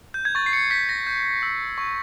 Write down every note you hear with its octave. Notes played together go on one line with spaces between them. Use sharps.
G6
G#6
C#6 A6
C7
C#7
G6 B6
A#6
G6
E6
C#6